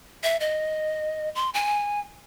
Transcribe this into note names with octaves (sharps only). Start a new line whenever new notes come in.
E5
D#5
C6
G#5